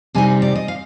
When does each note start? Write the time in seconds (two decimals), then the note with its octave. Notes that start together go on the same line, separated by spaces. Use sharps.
0.15 C3 G3 C4 D#4 G#5
0.42 D5
0.56 D#5
0.68 F5